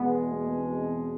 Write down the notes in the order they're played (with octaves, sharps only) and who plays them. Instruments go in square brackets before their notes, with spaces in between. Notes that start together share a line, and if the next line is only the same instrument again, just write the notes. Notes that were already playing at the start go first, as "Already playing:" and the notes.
Already playing: [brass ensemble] E2 B2 G#3 [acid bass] B3
[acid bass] A#3
B3
C4